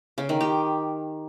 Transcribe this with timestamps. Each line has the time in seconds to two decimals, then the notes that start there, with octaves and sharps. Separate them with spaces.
0.18 C#3
0.29 D#3
0.41 G4